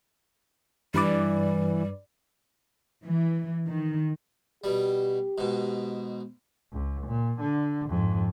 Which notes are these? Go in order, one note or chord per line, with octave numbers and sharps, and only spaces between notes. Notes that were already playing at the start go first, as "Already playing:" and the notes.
G2 E3 G3 B4 D5
E3
D#3
B2 G3 G4
G#2 B2
C#2
A#2
D3
F2 G#2